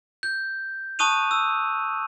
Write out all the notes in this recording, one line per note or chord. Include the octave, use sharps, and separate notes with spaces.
G6
A5 C#6 D#6 F#6 D#7 F7
E6